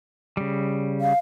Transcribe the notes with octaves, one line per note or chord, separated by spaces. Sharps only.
C#3 G3
F5